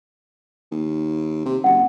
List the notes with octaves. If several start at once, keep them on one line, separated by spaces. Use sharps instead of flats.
D#2
C3
F#1 F#5